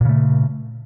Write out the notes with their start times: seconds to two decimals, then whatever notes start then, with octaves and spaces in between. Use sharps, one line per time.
0.01 A#2
0.05 C#3
0.09 A3